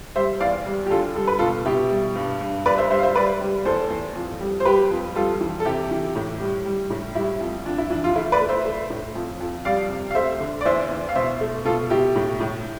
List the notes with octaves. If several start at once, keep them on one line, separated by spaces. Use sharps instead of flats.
G3 C5 E5
E2 D5 F5
G3
G4
D3 F4 A4
G3 A4
B4
B2 F4 A4
B2 E4 G4
G3
G2
G2
G2 B4 D5
C5 E5
G3 C5 E5
F5
C5 E5
G3 B4 D5
G3
E2 A4 C5
E2
F2
G3
C5
G3 G4 B4
F2
G3 F4 A4
E3
A4
C3 E4 G4
E3
A2
G3
G3
A2
G3 E4
F2
F2 D4
E4
E3 D4
F4
A3 E4
B4 D5
A3
C5 E5
A3
A2
F2
F2
G3 D5 F5
C3
F5
A3 C5 E5
D3
D5
E2 C5 E5
E2
F5
B2 C5 E5
A3
B2 F4 A4
B2 E4 G4
A2
A2